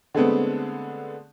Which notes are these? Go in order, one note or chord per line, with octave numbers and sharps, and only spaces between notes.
D3 G#3 A3 B3 C4